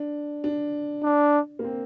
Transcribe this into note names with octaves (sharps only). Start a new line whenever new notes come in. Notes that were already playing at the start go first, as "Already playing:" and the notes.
Already playing: D4
D4
D4
A#3
C4